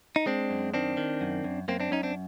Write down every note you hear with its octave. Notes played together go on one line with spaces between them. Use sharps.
D#4
G#3 C4 D4
F#2
D#3 C4 D4
D#3
F#2
F#2
F#2 A#3 C4
C4 D4
F#2 C#4 D#4
C4 D4